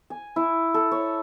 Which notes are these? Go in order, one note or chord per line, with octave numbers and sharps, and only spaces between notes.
G#5
E4
A4
C#5